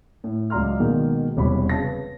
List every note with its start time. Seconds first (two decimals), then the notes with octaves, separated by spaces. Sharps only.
0.24 A2
0.50 C#2 F#3 D5 A#5 C6 F6
0.80 B2 D#3 G#3 A#3
1.37 E1 C3 G3 C#5 B5
1.69 C#3 A5 A#6
1.82 B4